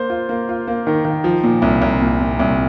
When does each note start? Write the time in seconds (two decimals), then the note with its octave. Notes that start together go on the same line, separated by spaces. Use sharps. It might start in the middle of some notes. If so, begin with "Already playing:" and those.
Already playing: A#3 C5
0.10 F4
0.29 A#3
0.49 F4
0.67 A#3
0.87 D#3
1.05 D#3
1.24 F3
1.43 A#2
1.62 C2
1.82 C2
2.01 A#2
2.20 A#2
2.39 C2